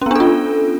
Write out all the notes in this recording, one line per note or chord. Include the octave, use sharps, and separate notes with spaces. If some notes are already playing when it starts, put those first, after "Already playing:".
B3 C#4 D4 F4 A4